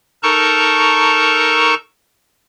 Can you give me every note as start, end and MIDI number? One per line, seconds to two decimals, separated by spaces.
0.23 1.75 63
0.23 1.75 69
0.23 1.75 70
0.23 1.75 81
0.23 1.75 82
0.23 1.75 85